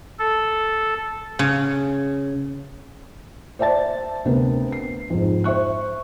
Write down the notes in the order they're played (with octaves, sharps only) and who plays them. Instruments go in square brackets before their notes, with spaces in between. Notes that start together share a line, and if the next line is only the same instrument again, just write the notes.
[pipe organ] A4
[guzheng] C#3
[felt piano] C5 D5 E5 A5 A6
D2 C3 B3 A#4
C7
F2 G#2
C5 E5 C#6 F#6